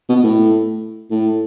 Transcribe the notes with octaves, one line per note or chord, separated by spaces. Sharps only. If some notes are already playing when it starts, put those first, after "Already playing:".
B2
A2
A2